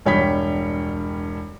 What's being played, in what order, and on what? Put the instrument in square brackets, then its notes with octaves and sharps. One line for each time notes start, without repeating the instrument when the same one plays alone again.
[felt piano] E1 G2 C#5 G5 B5 B6